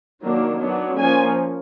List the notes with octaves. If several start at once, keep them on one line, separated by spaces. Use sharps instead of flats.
D#3 F#3 A#3 D4
F#3 B3 D4
F3 A#3 C#4 G#5